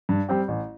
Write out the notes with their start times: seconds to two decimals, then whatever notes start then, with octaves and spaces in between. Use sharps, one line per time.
0.09 G2
0.29 G3 C4 G4
0.48 A1